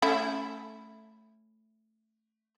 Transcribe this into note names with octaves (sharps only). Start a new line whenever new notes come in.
A3 C#4 E4